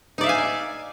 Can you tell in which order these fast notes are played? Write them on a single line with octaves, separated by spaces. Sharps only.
D#4 D5 E5 F5 G#5